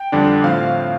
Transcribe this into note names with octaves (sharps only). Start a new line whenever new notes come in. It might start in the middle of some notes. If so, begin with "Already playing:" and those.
Already playing: G5
F2 D3 G3 D4
A2 F3 C4 F5